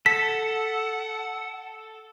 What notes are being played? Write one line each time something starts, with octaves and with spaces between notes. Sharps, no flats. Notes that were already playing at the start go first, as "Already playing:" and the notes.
A4 F#5 B6